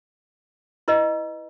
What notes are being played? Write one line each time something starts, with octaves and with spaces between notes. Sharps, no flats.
E4 B4 D#5